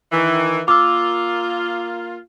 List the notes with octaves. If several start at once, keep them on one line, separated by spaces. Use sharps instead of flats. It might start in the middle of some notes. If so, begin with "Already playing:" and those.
D#3 E3
A#3 F4 D6 E6